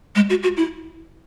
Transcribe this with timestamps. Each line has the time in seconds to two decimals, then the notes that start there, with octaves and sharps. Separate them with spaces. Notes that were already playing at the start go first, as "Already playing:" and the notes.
0.16 G#3
0.30 F#4
0.43 F#4
0.57 E4